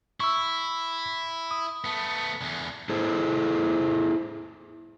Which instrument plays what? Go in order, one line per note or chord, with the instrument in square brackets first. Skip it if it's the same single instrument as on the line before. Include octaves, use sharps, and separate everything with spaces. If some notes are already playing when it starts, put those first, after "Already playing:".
[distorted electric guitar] E4 [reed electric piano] C#6 E6
[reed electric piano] D#6
[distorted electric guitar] A3 B3
E2 D3
[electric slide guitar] E4 G#4 A4 C5